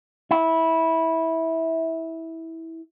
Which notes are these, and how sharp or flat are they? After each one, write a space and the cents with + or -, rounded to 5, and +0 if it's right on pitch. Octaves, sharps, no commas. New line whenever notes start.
E4 -15